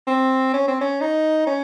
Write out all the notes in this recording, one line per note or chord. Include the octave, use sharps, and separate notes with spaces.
C4
C#4
C4
C#4
D#4
C#4